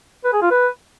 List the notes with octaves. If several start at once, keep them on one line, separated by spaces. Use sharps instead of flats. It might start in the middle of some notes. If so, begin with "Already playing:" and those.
B4
G#4
F4
B4